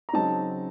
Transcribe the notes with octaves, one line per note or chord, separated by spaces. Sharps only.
A#5
C#3 F#3 C4 D#4 A5